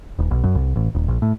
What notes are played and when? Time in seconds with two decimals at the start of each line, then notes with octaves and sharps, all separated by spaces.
0.19 D#1
0.31 B1
0.44 F#2
0.55 C2
0.76 A1
0.95 D#1
1.08 A#1
1.22 A2